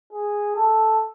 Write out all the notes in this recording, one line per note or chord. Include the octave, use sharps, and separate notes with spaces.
G#4
A4